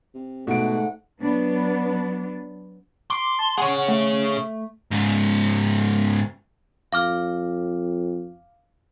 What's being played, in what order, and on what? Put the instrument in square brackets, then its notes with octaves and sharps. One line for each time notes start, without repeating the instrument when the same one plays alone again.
[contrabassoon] C3
[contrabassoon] G#2 [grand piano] B2 D7 [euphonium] A3 [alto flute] F#5
[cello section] F#3 B3 D4
[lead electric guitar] C6 [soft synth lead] D6
[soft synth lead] A5
[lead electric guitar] G#4 C#5 [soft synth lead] F#5
[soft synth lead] A3
[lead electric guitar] G#2 C#3
[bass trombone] F2 [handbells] F5 D6 F6